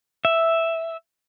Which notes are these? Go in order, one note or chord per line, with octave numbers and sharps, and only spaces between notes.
E5